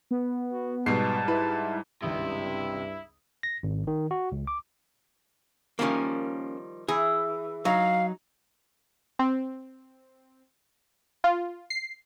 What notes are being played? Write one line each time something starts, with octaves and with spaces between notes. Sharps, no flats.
B3
F#4
G#2 B2 G3 A5 C7
E4 B4
G#1 C#2 G2 C3 E4 D#6
A#6
G#1
D#3
F#4
C#2
D6
D#3 F3 G3 A#3 C#4
E3 G#4
F#3 D#4 F5
C4
F4
C7